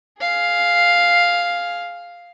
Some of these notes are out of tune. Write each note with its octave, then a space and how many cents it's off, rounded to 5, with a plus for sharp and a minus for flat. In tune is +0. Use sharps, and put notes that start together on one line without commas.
G#4 +5 F5 +0